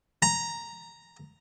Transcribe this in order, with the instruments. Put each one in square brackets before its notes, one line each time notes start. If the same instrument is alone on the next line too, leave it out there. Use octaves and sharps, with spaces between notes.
[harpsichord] A#5